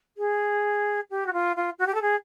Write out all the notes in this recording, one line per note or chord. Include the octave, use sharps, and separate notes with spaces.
G#4
G4
F#4
F4
F4
F#4
G4
A4
G#4